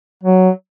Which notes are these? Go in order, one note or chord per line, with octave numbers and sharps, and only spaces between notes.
F#3